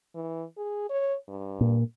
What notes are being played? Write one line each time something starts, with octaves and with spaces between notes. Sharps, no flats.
E3
G#4
C#5
G2
A#2